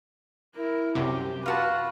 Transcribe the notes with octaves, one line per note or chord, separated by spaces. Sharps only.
E4 A#4
C2 F#2 C3 G4
F4 F#4 B4 A5